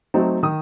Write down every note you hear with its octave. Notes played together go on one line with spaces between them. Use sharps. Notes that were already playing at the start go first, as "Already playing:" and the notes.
F#3 A3 C4 D#4
D#3 D#6